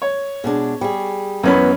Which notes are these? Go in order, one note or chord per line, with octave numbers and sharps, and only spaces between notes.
C#5
B2 G#3 D4
G3 G#4
F#2 E3 B3 C#4 D#5 B5